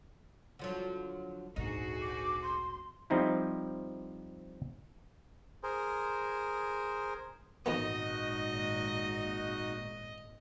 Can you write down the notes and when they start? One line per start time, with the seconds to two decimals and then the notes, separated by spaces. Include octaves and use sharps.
0.59 D3 F3 F#3
1.56 G#1 D2 A#2 D#4 F#4 G#4
2.01 D6
2.42 C6
3.10 F3 G3 C4 D#4 E4
5.63 G#4 A#4 C5
7.66 G#1 F2 A#2 D#3 B3 D#4 F#4 D#5